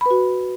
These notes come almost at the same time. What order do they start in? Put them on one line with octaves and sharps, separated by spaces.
B5 B4 F#4